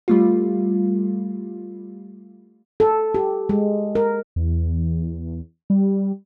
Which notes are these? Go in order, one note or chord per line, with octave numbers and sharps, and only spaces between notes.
G3 A3 F4
A4
G4
G#3
A#4
E2
G3